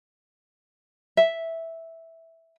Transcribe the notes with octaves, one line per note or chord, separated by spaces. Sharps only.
E5